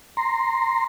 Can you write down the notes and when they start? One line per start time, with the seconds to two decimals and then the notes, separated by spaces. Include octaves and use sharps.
0.17 A#5 C6